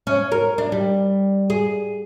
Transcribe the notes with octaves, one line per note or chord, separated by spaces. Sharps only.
C#4
A#4
D4
G3
G#4